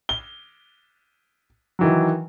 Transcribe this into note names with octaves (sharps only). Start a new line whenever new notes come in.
G7
D#3 E3 F#3